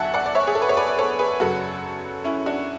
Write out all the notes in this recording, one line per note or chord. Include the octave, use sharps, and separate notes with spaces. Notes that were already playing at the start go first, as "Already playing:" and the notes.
Already playing: E2 D3 F#3 E5 F#5 G#5 A5
D5 F#5
D5
C#5 E5
G#4
A4
B4
C#5
B4 D5
D5
A4 C#5
G#4 B4
F#2 C#3 F#3 F#4 A4
C#4 E4
D4 F#4